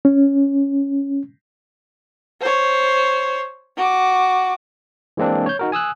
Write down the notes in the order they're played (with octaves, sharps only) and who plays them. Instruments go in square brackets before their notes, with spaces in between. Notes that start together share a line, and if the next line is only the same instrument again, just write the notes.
[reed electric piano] C#4
[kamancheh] C5 C#5
F#4 D6
[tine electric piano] E3 G#3 A#3 C4 D4
C#5 G6
D#4 F#4 A#4
G#5 D#6 E6 F#6